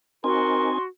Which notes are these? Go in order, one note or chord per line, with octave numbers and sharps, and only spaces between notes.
C4 D#4 F#4 A#4 G#5 C6